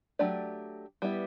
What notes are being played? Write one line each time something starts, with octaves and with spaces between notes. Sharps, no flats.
F#3 A3 D4 G4 D5
G3 B3 E4